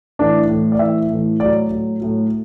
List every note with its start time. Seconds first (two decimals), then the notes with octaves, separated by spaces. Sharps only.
0.19 A2 E3 D4
0.49 A2 E3
0.72 D5
0.79 A2 E3 E5
1.10 A2 E3
1.40 A2 F#3 D5
1.71 A2 F#3
2.01 A2 F#3